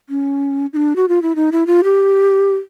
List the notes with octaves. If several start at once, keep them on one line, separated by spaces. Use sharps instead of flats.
C#4
D#4
D4
F#4
F4
E4
D#4
E4
F4
G4